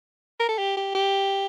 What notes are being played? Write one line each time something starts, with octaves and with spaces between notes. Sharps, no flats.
A#4
A4
G4
G4
G4